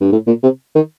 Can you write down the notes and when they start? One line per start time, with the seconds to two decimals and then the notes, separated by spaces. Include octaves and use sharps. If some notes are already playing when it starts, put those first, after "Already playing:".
0.01 G2
0.12 A2
0.27 A#2
0.43 C3
0.75 D#3